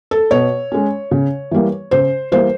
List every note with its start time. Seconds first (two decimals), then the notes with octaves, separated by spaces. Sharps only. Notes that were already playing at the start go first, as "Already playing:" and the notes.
0.11 A4
0.31 B2 C#5
0.72 G#3 C#4
1.11 C#3
1.51 E3 G3 A#3
1.91 C#3 C5
2.32 E3 G3 A#3 C5